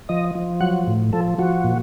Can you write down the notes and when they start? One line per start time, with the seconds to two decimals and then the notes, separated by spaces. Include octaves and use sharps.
0.09 F3 D#5
0.35 F3
0.61 F#3 F#5
0.87 A2
1.13 F3 A4
1.38 F3 F#4
1.64 A#2